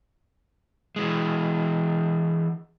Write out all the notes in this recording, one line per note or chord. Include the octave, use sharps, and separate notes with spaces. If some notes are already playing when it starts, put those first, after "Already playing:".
E3 G#3